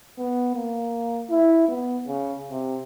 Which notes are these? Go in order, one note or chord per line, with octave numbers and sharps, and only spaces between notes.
B3
A#3
E4
B3
C#3
C3